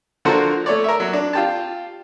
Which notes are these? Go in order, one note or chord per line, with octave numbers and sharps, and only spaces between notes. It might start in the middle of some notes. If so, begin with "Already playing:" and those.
D3 F3 F#4 A4 A#4 C5
A3 C#5 D5
A#4 E5
F#3
D4
F4 G4 A5